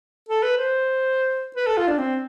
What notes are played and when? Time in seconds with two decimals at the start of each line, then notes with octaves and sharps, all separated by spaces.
0.29 A4
0.43 B4
0.58 C5
1.56 B4
1.67 A4
1.77 F4
1.88 D4
1.98 C4